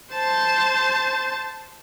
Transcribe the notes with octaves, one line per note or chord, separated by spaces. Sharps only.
C5 A5